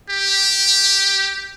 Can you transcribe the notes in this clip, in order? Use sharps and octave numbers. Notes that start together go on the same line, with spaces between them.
G4